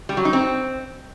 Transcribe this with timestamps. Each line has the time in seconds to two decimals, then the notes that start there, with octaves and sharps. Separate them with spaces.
0.09 G3
0.17 F#3
0.25 D#4
0.33 C4